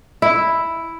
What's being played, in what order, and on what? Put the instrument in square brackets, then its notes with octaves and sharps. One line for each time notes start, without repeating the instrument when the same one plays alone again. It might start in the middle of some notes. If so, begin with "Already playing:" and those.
[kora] E4